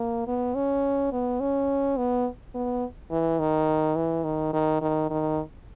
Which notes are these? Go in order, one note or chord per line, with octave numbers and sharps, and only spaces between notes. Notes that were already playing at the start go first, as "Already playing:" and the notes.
Already playing: A#3
B3
C#4
B3
C#4
B3
B3
E3
D#3
E3
D#3
D#3
D#3
D#3